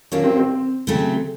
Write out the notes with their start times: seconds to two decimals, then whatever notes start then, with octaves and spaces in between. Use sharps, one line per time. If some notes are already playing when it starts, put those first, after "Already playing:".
0.12 F#3 A#3 C#4 D4 F4
0.24 C4
0.37 C4
0.87 C#3 F#3 A3 C4